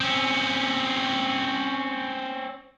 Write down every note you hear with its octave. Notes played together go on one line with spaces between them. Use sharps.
C4 C#4